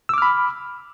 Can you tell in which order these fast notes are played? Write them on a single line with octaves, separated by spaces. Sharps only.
E6 D6 F6 B5